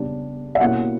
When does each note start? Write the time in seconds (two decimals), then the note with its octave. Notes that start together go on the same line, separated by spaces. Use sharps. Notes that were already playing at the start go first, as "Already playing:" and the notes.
Already playing: C#3 G3 B3 D4
0.55 E5
0.60 B2 A#3 C#4 E4 F#5